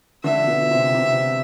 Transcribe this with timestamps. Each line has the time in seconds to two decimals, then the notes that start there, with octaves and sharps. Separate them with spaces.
0.24 D3 E5
0.47 B2
0.71 C3
0.94 C3